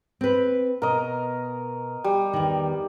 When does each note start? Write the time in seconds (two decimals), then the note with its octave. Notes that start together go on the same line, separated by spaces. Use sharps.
0.21 C4 B4
0.82 B2 A#4 D#5
2.04 G3
2.33 E2 D#3